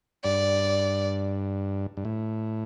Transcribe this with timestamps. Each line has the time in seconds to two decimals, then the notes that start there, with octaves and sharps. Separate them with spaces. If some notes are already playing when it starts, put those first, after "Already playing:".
0.24 G2 D5
1.97 G2
2.05 A2